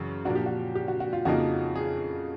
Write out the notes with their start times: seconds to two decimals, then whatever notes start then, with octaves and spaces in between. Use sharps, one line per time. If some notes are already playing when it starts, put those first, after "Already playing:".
Already playing: F#2 C#3 E3
0.25 A#2 F3 A#3 D4 F#4
0.36 G4
0.46 F#4
0.75 G4
0.88 F#4
1.00 F#4
1.13 F4
1.25 F2 C#3 F3 A#3 D#4 F#4
1.76 G#4